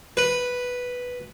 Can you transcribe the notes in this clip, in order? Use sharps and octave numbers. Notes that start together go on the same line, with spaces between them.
B4